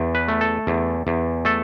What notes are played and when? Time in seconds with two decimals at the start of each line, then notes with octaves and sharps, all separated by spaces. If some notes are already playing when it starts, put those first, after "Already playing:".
Already playing: E2
0.15 B4
0.28 A3
0.41 A4
0.67 E2
1.07 E2
1.45 A3 A4